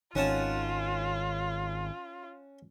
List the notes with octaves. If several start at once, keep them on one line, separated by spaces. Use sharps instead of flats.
G#1 D#3 C#4 F4 F#5 A5